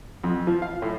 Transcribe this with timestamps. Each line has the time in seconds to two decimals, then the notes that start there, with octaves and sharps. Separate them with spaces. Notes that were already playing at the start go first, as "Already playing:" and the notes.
0.24 F2
0.47 F3
0.62 F5
0.82 A2